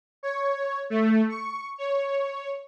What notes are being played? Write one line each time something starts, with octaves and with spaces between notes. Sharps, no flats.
C#5
A3
C#6
C#5